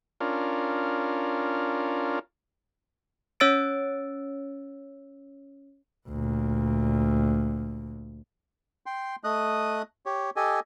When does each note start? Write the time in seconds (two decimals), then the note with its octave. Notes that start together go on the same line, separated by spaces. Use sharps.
0.20 C#4 D4 F4 A#4
3.40 C#4 C#5 E6 A6 D7
6.09 D2 A#2
8.86 G5 C6
9.24 A3 D#5 D#6 F#6
10.06 G4 C#5
10.36 G4 A4 D#5 G#5